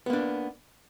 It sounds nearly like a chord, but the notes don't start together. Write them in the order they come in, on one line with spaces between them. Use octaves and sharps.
B3 A#3 D4